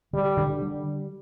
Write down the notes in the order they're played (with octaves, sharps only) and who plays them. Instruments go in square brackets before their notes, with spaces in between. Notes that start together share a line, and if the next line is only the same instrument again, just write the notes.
[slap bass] D3 [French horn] G3
[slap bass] D3
G3